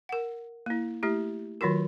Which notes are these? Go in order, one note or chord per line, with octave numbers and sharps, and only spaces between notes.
A#4 F#5
A#3 E4
A3 E4 G4
D#3 F#3 F4 F#4 A#4